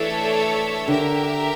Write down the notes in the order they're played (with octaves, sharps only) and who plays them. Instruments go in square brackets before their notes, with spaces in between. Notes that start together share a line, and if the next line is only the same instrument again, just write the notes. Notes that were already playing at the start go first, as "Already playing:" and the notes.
Already playing: [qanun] E3 [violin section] A3 D4 A4 C#5 E5
[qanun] D3 [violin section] G4 A#4 E5